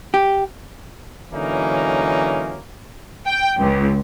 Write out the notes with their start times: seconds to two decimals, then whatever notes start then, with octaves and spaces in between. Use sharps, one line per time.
0.14 G4
1.32 D3 E3 F#3 A#3 C#4 D#4
3.27 G5
3.59 C#2